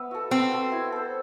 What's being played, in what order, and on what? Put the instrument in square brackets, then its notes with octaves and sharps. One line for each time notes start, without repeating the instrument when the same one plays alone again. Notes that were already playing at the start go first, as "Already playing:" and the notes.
Already playing: [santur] B3 E5
F#4 A4
[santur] B3 [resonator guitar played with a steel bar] C4
[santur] F#4 A4
E4
A4 C5